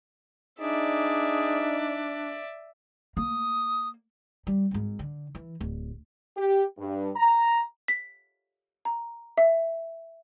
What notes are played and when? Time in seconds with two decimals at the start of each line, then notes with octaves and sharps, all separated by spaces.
0.60 D4 D#4 G#4 D5 E5
3.17 A#3 D#6
4.47 G3
4.71 G#1 G#2
4.99 D3
5.35 E3
5.61 D1
6.36 G4
6.77 G2
7.16 A#5
7.88 B6
8.85 A#5
9.38 E5